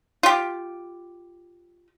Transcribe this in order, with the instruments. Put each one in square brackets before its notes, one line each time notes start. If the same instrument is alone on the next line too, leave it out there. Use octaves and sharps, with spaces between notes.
[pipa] F4 G4